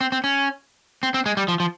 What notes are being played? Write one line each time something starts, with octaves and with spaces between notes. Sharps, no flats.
C4
C4
C#4
C4
C4
G#3
G3
F3
F3